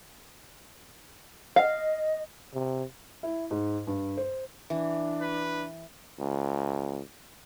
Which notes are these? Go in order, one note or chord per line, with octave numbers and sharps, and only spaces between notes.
D#5 F5
C3
E4
G#2
G2
C5
E3 D4
B4
C#2